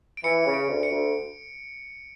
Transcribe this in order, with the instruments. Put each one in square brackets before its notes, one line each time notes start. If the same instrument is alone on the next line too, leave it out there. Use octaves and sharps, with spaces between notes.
[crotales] D7
[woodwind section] E3 [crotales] C#7
[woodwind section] C#3
[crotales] D7
[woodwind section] D2
[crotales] C#7
[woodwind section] D2